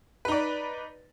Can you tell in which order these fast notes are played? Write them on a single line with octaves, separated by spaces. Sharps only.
B4 D#4 D5